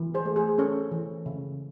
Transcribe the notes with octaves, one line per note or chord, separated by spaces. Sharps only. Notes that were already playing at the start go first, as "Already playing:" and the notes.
Already playing: E3
G#4 C5
A3
G#4 C5
C#4 A4 C#5
E3
C#3